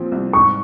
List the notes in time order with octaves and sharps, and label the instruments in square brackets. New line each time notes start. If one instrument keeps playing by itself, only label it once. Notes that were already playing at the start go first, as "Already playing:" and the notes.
Already playing: [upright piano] A#2 F3 C4
C2
[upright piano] G#2 [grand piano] C#6